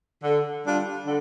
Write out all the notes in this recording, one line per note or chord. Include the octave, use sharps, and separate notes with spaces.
D3
G3 D4 F4
D3